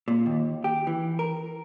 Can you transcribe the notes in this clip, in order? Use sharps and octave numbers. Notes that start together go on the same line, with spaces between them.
A#2
D#2
G4
E3
A#4